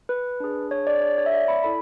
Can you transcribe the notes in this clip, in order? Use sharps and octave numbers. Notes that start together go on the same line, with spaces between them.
B4
D4 G#4
C#5
D5
C#5
C#5
E5
D5
B5
E4 A4 B5